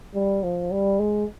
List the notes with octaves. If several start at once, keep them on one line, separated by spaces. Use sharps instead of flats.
G3
F3
G3
G#3